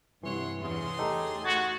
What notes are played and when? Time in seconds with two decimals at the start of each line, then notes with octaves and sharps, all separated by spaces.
0.23 G2 C3 E3 C#5 F#5 C6
0.61 E2 C#3 G#4 C6
0.99 A3 D#4 G4 A4
1.44 F#4 G#6 A6